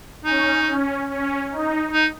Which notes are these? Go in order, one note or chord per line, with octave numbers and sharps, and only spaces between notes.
C#4 D#4
C#4
C#4
D#4
D#4